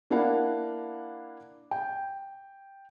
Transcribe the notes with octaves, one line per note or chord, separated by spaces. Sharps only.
A#3 D4 E4 A#4 F5 F#5
G5